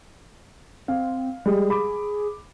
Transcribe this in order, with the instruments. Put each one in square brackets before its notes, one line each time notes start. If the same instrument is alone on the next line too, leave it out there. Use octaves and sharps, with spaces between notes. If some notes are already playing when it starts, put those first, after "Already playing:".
[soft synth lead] C4 [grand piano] F5
[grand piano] G3 G#3 [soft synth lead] G#4
[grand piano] B5 D6